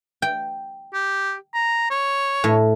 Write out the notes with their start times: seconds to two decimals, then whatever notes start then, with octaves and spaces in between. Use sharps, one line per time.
0.22 G5
0.94 G4
1.54 A#5
1.90 C#5
2.44 A2